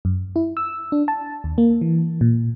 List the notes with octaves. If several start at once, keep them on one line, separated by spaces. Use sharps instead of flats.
F#2
E4
E6
D4
A5
D#2
A#3
E3
A#2